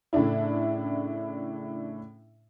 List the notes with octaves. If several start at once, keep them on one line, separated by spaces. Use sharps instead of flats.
A2 C#3 D4 E4